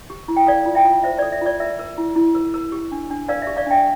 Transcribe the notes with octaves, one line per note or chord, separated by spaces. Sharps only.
G4
E4
G5
A4 D5 F5
F4
E5 G5
F4
C5 E5
D5
A4
E5
F4 D5
A#4 E5
A#4
E4
E4
A#4
A#4
G4
D4
D4
A#4 D5 F5
E5
G4
D5 F5
D4 E5 G5